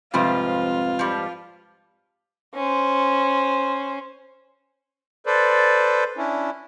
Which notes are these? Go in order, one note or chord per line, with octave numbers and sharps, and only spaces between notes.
F2 G#2 C3 F3 G3 F4 B4 F5
F3 G3
C#4 C5
A4 B4 C5 D5
C#4 D4 E4